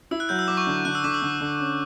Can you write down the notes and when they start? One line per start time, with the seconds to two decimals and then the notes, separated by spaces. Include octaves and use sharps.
0.11 E4 E6
0.20 F#6
0.29 F#3 G6
0.39 E6
0.48 F#3 D6
0.57 C#6
0.67 D3
0.85 D3 F#6
0.95 E6
1.04 D3 D6
1.14 E6
1.22 D3
1.41 D3
1.60 C#4